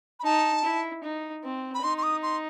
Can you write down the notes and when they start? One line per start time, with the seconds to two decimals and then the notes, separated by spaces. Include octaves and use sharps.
0.20 B5
0.24 D#4 A5
0.64 E4
1.04 D#4
1.44 C4
1.74 B5
1.83 D#4 C6
1.97 C6
2.03 D#6
2.22 C6